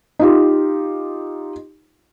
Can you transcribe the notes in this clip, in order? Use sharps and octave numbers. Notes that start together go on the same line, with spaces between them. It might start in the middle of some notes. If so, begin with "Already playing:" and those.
D#4 F4 G4